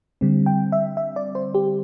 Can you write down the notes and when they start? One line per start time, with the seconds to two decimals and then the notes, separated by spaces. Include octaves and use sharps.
0.21 D3 G3 C4
0.46 G5
0.72 E5
0.97 E5
1.16 D5
1.35 C5
1.54 G4